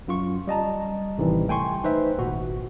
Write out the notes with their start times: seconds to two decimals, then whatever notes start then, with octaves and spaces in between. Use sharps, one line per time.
0.08 F#2 F4 C#6
0.47 G3 D#5 A5 A#5
1.18 A1 C3 D#3 E3 G3
1.48 A3 G5 G#5 C6 C#6
1.84 D#4 B4 C5 E5
2.17 G#1 A#2 F#4